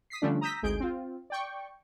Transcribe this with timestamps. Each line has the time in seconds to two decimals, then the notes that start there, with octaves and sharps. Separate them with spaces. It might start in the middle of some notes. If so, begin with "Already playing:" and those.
0.10 D#6 B6 C7
0.22 D3 F3 G3 A3 C#4 D4
0.41 A#5 D#6 E6 G6 A#6 B6
0.63 G#1 D2 G#3 G#4 G6 D7
0.80 C4 F4
1.30 D5 G5 C#6